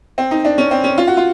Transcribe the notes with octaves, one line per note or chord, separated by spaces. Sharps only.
C4
D#4
D4
C#4
C4
C#4
F4
F#4
F4